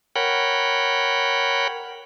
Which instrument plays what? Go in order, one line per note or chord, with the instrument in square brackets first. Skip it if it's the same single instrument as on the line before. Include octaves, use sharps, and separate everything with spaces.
[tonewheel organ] A#4 C#5 F#5 G5 B5